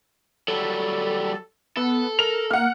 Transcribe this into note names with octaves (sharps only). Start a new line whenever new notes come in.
F#3 G3 A4
B3 A4
A#4 F7
A#3 F#5 F6